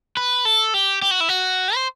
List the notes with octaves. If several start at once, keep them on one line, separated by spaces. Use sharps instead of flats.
B4
A4
G4
G4
F#4
E4
F#4
C5